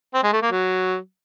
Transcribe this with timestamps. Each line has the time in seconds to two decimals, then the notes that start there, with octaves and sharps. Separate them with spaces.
0.14 C4
0.23 G#3
0.33 A3
0.42 A#3
0.51 F#3